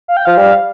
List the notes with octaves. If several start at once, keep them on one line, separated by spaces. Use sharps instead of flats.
F5
G5
F3 F5
G3 F5